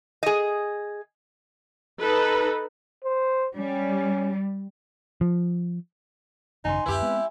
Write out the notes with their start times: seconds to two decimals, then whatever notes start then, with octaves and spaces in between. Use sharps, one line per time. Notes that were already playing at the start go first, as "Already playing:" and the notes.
0.23 G#4 D#5
2.00 D#4 A4 B4
3.05 C5
3.57 G3 C#4
5.21 F3
6.65 G#1 F#2 C#3 D#4 G#5 C6
6.86 D1 F#2 E4 G4 B4
7.02 G#3 B3 C4